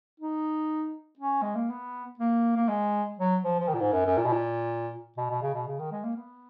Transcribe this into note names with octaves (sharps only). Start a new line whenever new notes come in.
D#4
C#4
G#3
A#3
B3
A#3
A#3
G#3
F#3
F3
F3
D#3
A#2
G#2
F#2
F#2
A#2
B2
A#2
B2
B2
C#3
B2
C#3
D#3
G#3
A#3
B3